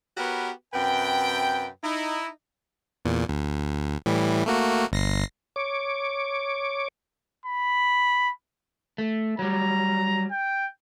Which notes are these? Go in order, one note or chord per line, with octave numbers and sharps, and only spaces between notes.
B3 F#4 G4 A#4 B4 C#5
F#2 C3 B4 G5
D#4 E4
E2 A#2
D2
A2 E3 G3
A3 A#3 F#4
G1 A#6 C7
C#5 D6
B5
A3
F#3 G3 A#5
G5